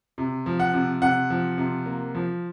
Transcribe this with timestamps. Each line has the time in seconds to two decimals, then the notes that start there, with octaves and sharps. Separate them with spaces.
0.18 C3
0.46 F3
0.60 F#5
0.74 C3
1.02 C3 F#5
1.30 F3
1.58 C3
1.86 A#3
2.15 F3